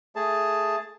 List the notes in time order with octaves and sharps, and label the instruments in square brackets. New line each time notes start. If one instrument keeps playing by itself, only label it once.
[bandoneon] A3 G#4 A5